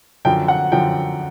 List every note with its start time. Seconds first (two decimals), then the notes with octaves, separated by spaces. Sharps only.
0.25 F#2 D3 F3 G5
0.48 F#5
0.72 F#2 D3 F3 G5